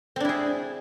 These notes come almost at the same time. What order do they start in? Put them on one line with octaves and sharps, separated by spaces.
C4 D4 E4 G#4